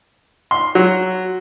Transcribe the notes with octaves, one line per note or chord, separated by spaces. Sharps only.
C6
F#3